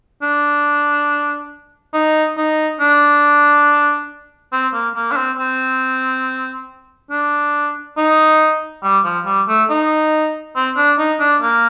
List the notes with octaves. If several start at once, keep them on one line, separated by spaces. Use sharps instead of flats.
D4
D#4
D#4
D4
C4
A#3
A#3
D4
C4
C4
D4
D#4
G3
F3
G3
A3
D#4
C4
D4
D#4
D4
A#3